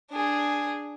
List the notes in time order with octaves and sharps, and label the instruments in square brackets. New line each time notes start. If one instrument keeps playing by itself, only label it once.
[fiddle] D4 G#4